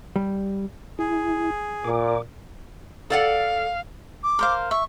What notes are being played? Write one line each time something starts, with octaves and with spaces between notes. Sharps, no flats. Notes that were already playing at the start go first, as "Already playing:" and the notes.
G3
E4 G#4
A#2 D6
A4 D5 F5 F#5
D6
A#4 C5 F5
E5 C#6